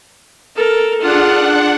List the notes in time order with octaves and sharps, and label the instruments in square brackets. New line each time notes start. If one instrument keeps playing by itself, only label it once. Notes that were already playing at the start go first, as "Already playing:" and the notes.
[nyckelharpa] A4 A#4
[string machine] D4 F#5 [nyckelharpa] F4 G#4